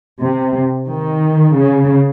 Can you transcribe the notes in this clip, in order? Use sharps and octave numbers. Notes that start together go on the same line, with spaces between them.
C3
D#3
C#3